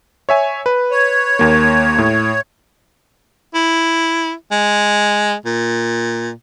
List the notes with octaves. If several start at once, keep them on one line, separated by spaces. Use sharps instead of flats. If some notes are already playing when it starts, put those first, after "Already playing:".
C#5 E5 G#5
B4
C#5
D#2 A#3
A2
E4
G#3
A#2